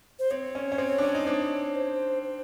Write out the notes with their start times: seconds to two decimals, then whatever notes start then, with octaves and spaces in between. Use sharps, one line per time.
0.19 C5
0.31 C4 C#5
0.55 C#4
0.72 C#4
0.78 C4
0.98 D4
1.03 C#4
1.15 D#4
1.27 C4 D4
1.76 C5
2.23 C5